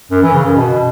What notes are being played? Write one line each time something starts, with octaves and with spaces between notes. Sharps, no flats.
F#2
E3
C#3
F#2
B2